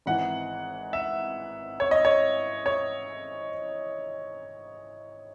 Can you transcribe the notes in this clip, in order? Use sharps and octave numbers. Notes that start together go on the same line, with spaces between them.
G#1 G#2 E3 F#5
E5
C#5
D#5
C#5
C#5